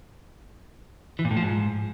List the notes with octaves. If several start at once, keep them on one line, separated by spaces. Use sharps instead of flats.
E3
A#2
A2
F3
G#2